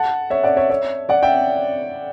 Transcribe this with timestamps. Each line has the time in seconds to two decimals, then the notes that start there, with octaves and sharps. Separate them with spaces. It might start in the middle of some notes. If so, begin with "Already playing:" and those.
Already playing: F#5 A5
0.30 C#5 E5
0.43 D5 F#5
0.57 C#5 E5
0.70 C#5 E5
1.09 D5 F#5
1.23 E5 G5